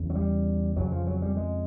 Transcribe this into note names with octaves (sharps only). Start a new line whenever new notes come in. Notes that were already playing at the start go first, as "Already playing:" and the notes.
Already playing: E2 C#3
F#3
G3
F2 C#3 F#3
F3
F#3
G3
G#3